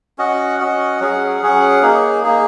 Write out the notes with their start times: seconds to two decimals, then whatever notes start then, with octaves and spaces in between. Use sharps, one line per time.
0.18 C#4 F#4 D#5 F#5
0.59 C#4 F#4 D#5 F#5
1.00 F#3 C#4 G#4 F#5
1.42 F#3 C#4 G#4 F#5
1.82 A#3 D#4 G#4
2.24 A#3 D#4 G#4